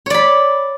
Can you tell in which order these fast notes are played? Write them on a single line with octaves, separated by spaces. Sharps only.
C#5 D5 B5